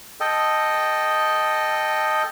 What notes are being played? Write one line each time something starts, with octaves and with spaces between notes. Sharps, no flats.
A4 D#5 G5